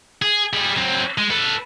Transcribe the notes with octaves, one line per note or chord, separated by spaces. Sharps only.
G#4
G3 G#4
F#3 C4
G#3
A4 B4